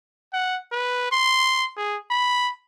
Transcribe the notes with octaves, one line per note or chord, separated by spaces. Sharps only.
F#5
B4
C6
G#4
B5